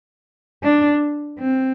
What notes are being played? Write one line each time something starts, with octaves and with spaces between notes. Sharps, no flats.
D4
C4